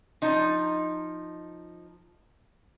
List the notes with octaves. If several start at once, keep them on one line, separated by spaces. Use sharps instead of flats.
F3 D#4